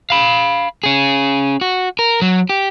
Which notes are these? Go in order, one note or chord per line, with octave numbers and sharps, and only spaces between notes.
F5 B5
C#4 G#4
F#4
A#4
F#3
G4